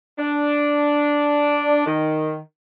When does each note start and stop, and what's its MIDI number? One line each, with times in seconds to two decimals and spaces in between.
0.19 1.82 62
1.86 2.37 51